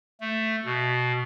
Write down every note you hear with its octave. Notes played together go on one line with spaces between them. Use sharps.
A3
B2